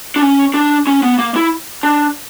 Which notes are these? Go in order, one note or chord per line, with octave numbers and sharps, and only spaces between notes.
D4
C#4
D4
C#4
B3
A#3
E4
D4